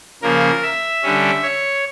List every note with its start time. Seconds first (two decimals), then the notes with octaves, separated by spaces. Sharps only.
0.22 C#3 F3 A#3 A#4
0.63 E5
1.03 D3 G3 C#4
1.43 C#5